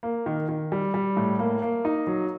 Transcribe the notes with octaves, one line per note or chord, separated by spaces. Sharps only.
A#3
D#3
D#3
G3
G3
A2
A#3
A#3
D#4
F#3